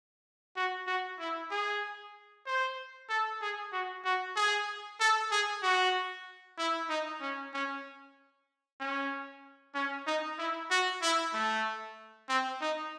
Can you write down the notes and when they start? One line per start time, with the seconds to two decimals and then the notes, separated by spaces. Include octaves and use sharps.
0.56 F#4
0.87 F#4
1.20 E4
1.51 G#4
2.46 C5
3.10 A4
3.42 G#4
3.73 F#4
4.04 F#4
4.36 G#4
5.00 A4
5.31 G#4
5.63 F#4
6.58 E4
6.89 D#4
7.21 C#4
7.54 C#4
8.80 C#4
9.75 C#4
10.07 D#4
10.38 E4
10.71 F#4
11.02 E4
11.34 A3
12.29 C4
12.61 D#4